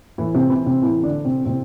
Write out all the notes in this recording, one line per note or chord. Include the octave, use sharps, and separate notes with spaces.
A2 E3 E4
C3 C4
E3 E4
C3 C4
A2 E3 E4
D3 D4
E3
C3 C4
A2 C3 C4